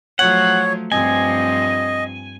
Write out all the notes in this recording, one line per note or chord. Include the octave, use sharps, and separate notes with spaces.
F3 F#3 A3 C#5 F#5
G2 F3 C4 D#5 G#5